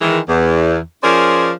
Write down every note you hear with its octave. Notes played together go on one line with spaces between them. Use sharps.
D#3 E3 G#3
E2
F3 C#4 G#4 A#4 C5 D5